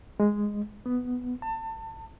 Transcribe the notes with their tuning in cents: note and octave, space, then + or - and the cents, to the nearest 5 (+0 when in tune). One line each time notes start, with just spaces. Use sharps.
G#3 -5
B3 +5
A5 +30